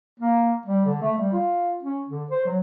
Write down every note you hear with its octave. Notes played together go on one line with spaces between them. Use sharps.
A#3
G3
D3
A3
G3
F4
C#4
D3
C5
F#3